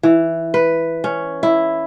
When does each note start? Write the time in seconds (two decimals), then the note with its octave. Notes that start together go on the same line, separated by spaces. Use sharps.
0.03 E3
0.54 B4
1.04 C#4
1.43 E4